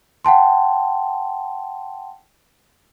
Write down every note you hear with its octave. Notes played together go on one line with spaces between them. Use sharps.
F#5 G5 A5 C6